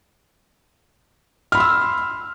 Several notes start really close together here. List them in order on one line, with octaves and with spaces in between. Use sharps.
F6 B5 C6 E6